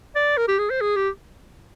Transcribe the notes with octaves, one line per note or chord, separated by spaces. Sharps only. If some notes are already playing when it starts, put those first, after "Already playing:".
D5
A#4
G4
G#4
C5
G#4
G4